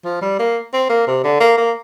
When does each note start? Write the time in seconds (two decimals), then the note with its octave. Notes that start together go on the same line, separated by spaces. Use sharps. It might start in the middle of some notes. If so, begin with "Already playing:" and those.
0.04 F3
0.22 G3
0.39 A#3
0.73 C4
0.89 A#3
1.07 C3
1.24 D3
1.40 A#3
1.58 A#3